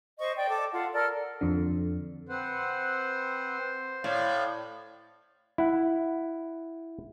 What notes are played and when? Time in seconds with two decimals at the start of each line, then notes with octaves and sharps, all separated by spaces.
0.19 C5 D#5 C#6
0.36 D5 G5
0.48 A4 D6
0.73 F4 A4 F#5
0.93 A4 A#4 D5 F6
1.41 F2 D3
2.29 C4 B4 C5 F#5
4.04 A2 D5 F5
5.58 E4 F#5